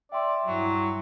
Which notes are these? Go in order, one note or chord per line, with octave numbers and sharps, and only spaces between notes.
D5 E5 G5 C6
G2 F#3 E4